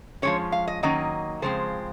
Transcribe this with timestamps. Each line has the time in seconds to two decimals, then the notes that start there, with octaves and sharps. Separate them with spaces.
0.22 F3 G#3 C#4 C#5
0.52 F5
0.67 D#5
0.83 D#3 F#3 A#3 C#4 D#5
1.42 C#3 F3 G#3 C4 C5